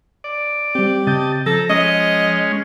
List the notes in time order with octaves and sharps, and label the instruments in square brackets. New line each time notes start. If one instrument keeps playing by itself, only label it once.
[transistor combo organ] D5
[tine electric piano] G3 C4 [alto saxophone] G4
[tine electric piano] C#3 C4 G6 [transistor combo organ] D#5 A5
[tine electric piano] F3 [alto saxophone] A4 [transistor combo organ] A#5
[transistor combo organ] G#3 C#4 [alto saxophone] D#5